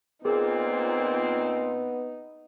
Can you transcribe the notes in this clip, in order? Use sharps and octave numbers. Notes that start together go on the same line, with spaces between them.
A#2 B3 C4 D#4 G#4 A#4